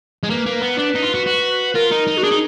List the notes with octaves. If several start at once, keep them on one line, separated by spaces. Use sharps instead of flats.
G#3
A#3 B4
A#3
B3
D4
D#4
F4
F#4
F#4
F4 A#4
D#4
D#4
F#4
D4 G#4
D#4